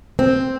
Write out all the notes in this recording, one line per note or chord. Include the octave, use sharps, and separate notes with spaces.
C4